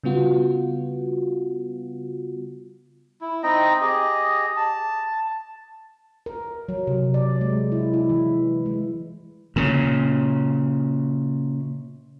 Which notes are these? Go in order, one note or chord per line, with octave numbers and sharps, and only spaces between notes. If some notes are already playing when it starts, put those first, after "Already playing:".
C#3 G3 B3 F4 F#4
E4
C4 D#4 D#5 G5
G4 G#4 D#5
A5
A#4
F#3
C3
D5
G#3
E4
E4
E3
G#3
A#2 C#3